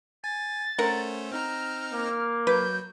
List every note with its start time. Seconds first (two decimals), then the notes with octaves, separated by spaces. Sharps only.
0.24 G#5 A6
0.78 A3 C#4 A#4 C5 F#5
1.32 C4 D#4 A#5 F6
1.92 A#3
2.47 F#3 B4 G6